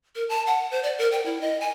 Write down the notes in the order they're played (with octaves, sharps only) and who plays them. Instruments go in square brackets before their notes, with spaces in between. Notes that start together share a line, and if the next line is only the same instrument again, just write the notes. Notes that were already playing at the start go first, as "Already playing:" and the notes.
[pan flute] A#4
A5
F#5
C5
D5
A#4
G5
E4
D#5
G#5